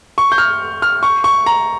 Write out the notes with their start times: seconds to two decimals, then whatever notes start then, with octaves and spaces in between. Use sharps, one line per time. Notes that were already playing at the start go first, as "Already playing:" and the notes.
0.18 C#6
0.32 G6
0.38 F6
0.82 F6
1.03 C#6
1.24 C#6
1.46 A#5